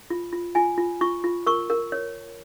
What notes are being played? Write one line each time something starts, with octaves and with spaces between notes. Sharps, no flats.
F4
F4
F4 G#5
F4
F4 C#6
F4
A#4 C#6
A#4
C#5